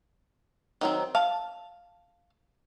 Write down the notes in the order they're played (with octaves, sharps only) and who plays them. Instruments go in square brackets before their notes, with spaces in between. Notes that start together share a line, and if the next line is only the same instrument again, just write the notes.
[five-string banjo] D#3 F#3 C4
F5 A5